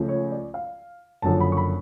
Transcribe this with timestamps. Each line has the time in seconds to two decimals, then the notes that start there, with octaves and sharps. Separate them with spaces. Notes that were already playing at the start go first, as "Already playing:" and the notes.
Already playing: C#2 C#3 F3 A3 C#4
0.09 C#5
0.32 D5
0.54 F5
1.22 F#1 F#2 D3 F3 A5
1.40 B5
1.52 C#6
1.57 B5